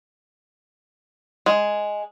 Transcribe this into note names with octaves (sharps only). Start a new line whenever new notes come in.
G#3